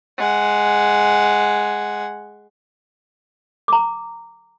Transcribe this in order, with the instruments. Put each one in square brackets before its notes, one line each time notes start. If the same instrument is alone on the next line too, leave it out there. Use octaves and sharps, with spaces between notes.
[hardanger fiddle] G#3 F#5
[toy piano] A#5 D6